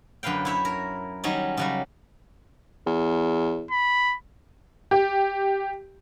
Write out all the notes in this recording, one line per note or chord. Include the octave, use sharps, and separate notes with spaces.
F#2 D3 B4 F5 G5
E4 C#5 E5
A#4
D#3 F#3 G3 C#4 D#4
C#3 F#3 G3
E2
B5
G4